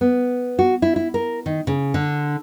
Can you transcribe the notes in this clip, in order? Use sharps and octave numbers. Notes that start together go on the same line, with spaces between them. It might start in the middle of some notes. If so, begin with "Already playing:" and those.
B3
F#4
E4
E4
A#4
D#3
C#3
D3